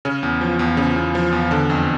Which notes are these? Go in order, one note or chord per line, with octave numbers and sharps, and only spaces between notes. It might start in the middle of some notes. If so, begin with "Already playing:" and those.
C#3 C#4
E2
F3
E2
C#3
E2
F3
E2
D3 D4
F2